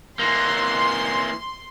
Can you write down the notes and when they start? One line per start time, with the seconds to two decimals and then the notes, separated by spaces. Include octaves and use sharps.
0.19 E3 A#3 C6